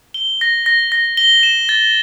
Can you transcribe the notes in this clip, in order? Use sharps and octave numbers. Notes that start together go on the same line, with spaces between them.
G7
A#6
A#6
A#6
G7
E7
A6